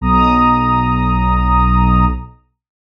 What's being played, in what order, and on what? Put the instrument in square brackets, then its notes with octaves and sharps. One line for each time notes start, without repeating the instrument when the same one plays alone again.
[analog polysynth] B1 A#5 D#6